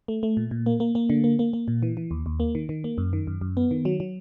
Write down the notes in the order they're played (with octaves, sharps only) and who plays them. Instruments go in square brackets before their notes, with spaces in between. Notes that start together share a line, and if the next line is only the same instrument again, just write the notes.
[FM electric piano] A3
A3
A#2
A#2
A#3
A#3
A#3
D3
A#3
A#3
A#3
A#2
E3
E3
D#2
D#2
A#3
D#3
D#3
A#3
F#2
D#3
F#2
F#2
B3
D#3
F#3
F#3